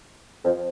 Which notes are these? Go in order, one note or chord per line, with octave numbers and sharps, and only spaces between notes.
F2